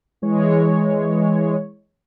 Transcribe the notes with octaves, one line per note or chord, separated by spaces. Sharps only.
E3 G#3 C#5